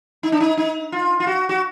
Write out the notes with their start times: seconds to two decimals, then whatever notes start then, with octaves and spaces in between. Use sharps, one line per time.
0.23 D#4
0.32 D4
0.40 D#4
0.57 D#4
0.92 F4
1.20 F4
1.27 F#4
1.49 F#4